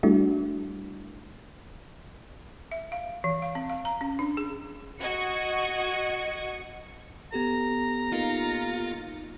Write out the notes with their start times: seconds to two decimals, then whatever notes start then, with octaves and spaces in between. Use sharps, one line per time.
0.03 G3 A3 D4 E4 F#4
2.72 E5
2.92 F5
3.24 E3
3.42 F5
3.55 C4
3.70 F5
3.85 A#5
4.01 C#4
4.19 D4
4.37 G#4
5.00 F#4 D#5 G#6 C#7
7.32 B3 G4 A4 A#5
8.13 A#3 D#4 F4 C#7